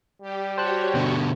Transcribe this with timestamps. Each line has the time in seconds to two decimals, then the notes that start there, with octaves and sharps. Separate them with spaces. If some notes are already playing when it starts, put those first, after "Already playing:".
0.22 G3 G4
0.58 F#4 G4 C5 C#5 A5 F#6
0.95 B2 D3